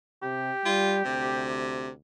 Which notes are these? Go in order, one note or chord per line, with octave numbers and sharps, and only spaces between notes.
C3 G4
G3 F4
D2 C3